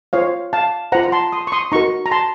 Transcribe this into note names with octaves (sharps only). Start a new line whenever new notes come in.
F4 C5 C#5 F5
F5 A5
F4 C5 F#5 A#5
A#5
A5 C6
C6 D#6
C#6
C6 D#6
D#4 F#4 A#4 A#5 C#6
A#5
A5 C6